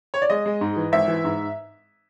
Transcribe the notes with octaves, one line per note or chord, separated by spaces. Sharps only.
C#5
D5
G#3 D#5
G#3
G#2
E3
G#1 E5
E3
G#2